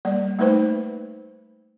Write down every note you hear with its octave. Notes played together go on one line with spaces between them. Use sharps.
G3 A#3 D5
A3 A#3 D#4 B4 C5 G5